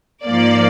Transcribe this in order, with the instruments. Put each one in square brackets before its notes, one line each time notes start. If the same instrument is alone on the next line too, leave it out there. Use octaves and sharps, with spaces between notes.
[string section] G#2 F3 A#3 D5